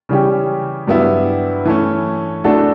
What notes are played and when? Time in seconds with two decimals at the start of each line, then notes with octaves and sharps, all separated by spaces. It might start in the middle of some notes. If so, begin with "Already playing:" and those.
0.09 C#3 E3 G3 C#4 G4
0.87 G2 F#3 B3 E4 G4
1.65 E3 A3 C#4
2.44 E3 A3 D4 F#4 A4